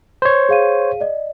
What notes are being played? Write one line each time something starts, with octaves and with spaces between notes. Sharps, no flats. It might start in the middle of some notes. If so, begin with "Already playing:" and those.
C5 C#5
G#4 F5 D#7
D5 D#5